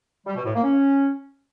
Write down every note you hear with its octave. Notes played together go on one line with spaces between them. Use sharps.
G3
B2
A2
A#3
C#4